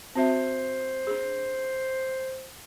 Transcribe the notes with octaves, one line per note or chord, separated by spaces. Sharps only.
C4 F#4 C5 E5
D4 G#4